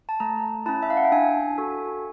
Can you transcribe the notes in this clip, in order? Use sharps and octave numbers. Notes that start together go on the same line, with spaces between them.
A5
A3 A#5
C#4 E4 A5
E5
F5
F#5
G5
D4 G#5
F#4 A4